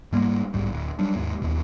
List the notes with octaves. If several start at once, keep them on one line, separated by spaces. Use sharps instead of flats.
G#2 G3 G#3 A#3
B1 G#2 G3
D1
F#3 G3 D4
D#2 G#2 G#3
D#2 B2